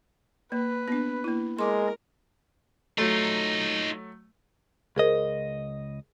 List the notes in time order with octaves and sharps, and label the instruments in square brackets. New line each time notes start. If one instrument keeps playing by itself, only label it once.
[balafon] A#3 [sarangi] B4
[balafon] B3 D4
A#3 E4
[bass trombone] G#3 [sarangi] A#4 [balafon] C6 D6
[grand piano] F#3 A3 [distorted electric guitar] D#4 F4
[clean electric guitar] C#2 D#5 [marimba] G#4 A#4 C5